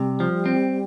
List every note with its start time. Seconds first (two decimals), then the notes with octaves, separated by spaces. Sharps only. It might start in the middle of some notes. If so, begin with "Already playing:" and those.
Already playing: C3 G3
0.20 F3
0.46 C4